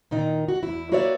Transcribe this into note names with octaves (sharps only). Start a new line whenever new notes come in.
A#2 D#3 D#4
F#4
E2 E4
A#3 F#4 B4 C#5 D5 E5